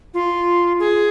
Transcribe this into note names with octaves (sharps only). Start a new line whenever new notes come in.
F4
G#4